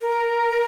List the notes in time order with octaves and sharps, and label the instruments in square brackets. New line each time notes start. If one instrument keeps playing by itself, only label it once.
[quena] A#4